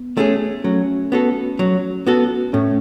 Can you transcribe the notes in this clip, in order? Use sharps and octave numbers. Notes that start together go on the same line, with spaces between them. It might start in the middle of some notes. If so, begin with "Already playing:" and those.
Already playing: B3
A3 C#4 G#4
F#3 A3 C#4
B3 F#4 A4
F#3
B3 F#4 A4
A2 A3 C#4